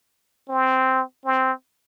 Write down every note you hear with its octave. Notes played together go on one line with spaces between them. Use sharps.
C4
C4